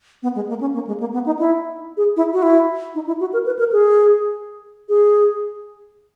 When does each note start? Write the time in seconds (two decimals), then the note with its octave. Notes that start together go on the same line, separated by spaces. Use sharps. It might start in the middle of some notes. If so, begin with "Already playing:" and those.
0.23 B3
0.35 G#3
0.49 A#3
0.61 C#4
0.74 A#3
0.87 G#3
1.00 A#3
1.13 B3
1.26 D#4
1.39 E4
1.97 G#4
2.16 E4
2.33 F#4
2.42 E4
2.95 D#4
3.07 E4
3.20 F#4
3.33 A#4
3.46 B4
3.59 A#4
3.72 G#4
4.89 G#4